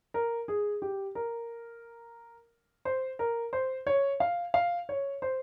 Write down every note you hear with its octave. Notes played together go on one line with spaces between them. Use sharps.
A#4
G#4
G4
A#4
C5
A#4
C5
C#5
F5
F5
C#5
C5